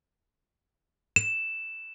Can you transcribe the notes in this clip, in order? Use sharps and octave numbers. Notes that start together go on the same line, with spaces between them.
E7